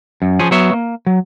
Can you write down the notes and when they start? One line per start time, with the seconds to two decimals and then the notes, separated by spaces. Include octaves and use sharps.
0.22 F#2
0.39 F3 C#4 G#4
0.51 F#3 B3 C#5 E5
0.73 A#3
1.06 F#3